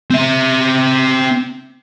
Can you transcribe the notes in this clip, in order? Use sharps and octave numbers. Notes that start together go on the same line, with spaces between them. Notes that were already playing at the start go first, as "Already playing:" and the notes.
C4 E5